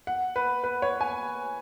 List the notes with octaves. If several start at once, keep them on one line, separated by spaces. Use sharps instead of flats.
F#5
B4
B4
C#5
G#5